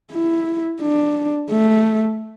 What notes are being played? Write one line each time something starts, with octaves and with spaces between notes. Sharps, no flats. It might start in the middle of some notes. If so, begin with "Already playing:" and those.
E4
D4
A3